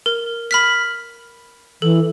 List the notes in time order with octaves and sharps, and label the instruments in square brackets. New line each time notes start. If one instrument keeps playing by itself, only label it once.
[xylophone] A#4
B5 F6 B6
[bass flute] E3 [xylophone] A4